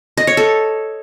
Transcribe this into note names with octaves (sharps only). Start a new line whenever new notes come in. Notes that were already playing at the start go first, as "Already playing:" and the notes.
D#5
C#5
A4